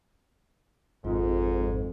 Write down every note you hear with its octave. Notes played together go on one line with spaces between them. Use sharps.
G#1 F2 G#2 F4